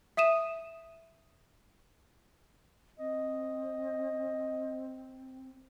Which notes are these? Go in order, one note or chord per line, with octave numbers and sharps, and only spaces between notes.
E5 D#6 D#7 E7
C4 D#5